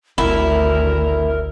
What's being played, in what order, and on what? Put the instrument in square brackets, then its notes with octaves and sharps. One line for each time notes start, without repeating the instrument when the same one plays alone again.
[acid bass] G#1 [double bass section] D2 [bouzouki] E4 [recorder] A#4